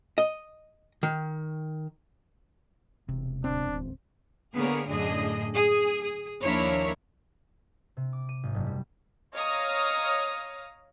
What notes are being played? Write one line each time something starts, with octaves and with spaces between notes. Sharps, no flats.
D#5
D#3
E1 C3
D1 C4 D4
D3 A#3 B3 G#4 A#4 C#5
F#2 A2 D3 D4 G#4 D#5
G#4
G#4
D#2 F3 D4 E4 A#4 C#5
C3
D6
D#7
G#1
F#1
G3
C#5 D#5 F5 A#5 D#6 F6